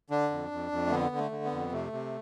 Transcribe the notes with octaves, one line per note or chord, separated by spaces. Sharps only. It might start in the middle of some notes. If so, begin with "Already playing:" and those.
D3 D4
F2
F2
F2
A3
D3 B3
D3
A3
D3
B3
F2
C3 A3
C3